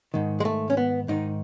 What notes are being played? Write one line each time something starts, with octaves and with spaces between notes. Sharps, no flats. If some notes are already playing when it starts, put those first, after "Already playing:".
G#2 D#3
G#3
A3
C#4
B3
G#2 D#3 D#4